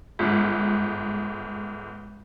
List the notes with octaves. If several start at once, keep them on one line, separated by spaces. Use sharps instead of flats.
G1 G#2